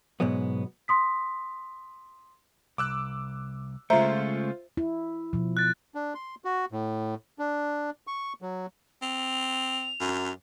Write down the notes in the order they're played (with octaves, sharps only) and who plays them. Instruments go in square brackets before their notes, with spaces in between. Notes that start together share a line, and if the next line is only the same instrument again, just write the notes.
[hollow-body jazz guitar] G#2 B2 F#3 G#3 B3
[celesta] C6 D#6 B6
[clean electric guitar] C2 [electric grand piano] D6 E6 F#6
[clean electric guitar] C#3 G#3 A3 [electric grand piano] F4 C5 [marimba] E5 A#5
[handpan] E4
B2 F3
[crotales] F#6 A6
[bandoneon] D4
C6
F#4
A2
D4
C#6
F#3
[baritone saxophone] C4 [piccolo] F7
[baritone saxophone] F#2